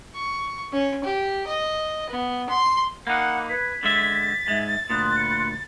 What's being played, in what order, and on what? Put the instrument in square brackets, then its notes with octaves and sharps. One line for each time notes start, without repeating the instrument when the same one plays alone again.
[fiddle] C#6
C#4
G4
D#5
B3
C6
[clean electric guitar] A#3 D#4 [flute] F#5 [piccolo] B5 [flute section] D6 F#6
[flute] B4 [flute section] G#6 [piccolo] B6
[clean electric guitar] D3 G#3 E5 [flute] A6
[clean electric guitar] G#2 G#3 [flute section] E5
[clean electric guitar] D2 A#2 [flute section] B5 C6 F#6 [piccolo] D#6
[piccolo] C#7